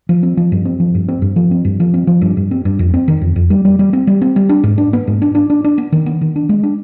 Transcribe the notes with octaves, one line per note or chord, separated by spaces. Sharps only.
F3
C4
F3
G2
C4
F3
G2
C4
G2
F3
C4
G2
F3
C4
F3
G2
G2
C4
G2
F2
C4
D#3
F2
F2
G3
G3
G3
C4
G3
C4
G3
D4
G#2
D4
B3
G#2
D4
D4
D4
D4
B3
D#3
B3
D#3
D4
G#3
D4